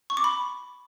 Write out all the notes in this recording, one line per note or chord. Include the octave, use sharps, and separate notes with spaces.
C#6
D6
B5